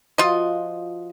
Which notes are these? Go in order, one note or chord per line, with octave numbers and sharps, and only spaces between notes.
F3 F4 F#4 D#5